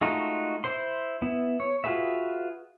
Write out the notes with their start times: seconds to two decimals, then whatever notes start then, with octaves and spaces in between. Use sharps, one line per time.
0.01 G#3 A3 D#4 F4 F#4
0.64 E4 C5 C6
1.22 B3 E4
1.60 C#5
1.84 F4 F#4 G#4 B4 E5